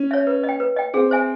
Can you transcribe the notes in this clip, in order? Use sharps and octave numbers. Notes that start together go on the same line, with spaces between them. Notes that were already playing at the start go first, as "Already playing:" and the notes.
Already playing: C#4
C#5 E5
B4
D#5
G5
B4
D#5 G5
C4 G#4
C5 E5 G#5